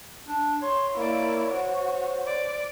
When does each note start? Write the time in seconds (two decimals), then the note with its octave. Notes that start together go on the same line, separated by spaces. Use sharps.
0.27 D4
0.62 C#5 C6
0.97 A#3 E4 D5
1.53 F#4 C5
2.26 D5